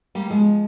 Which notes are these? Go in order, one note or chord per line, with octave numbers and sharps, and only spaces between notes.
G3 A#3
F3 G#3